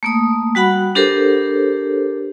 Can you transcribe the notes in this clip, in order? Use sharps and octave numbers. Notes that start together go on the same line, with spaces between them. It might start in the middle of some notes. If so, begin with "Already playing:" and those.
A3 A#3 D#6
G3 F#4 F#5 B5
D4 G4 A4 A#4 C5